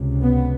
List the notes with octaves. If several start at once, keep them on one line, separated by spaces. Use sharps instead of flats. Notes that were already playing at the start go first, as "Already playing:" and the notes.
Already playing: C#2 C3
B3